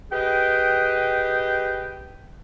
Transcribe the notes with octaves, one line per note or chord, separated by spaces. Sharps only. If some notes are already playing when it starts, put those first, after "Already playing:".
G4 G#4 B4 D#5 G5